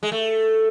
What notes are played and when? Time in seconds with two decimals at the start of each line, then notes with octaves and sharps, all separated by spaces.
0.03 G#3
0.12 A3